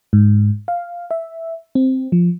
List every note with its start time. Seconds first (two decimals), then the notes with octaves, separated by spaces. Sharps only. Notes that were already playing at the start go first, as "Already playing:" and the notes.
0.13 G#2
0.68 F5
1.11 E5
1.75 C4
2.12 F3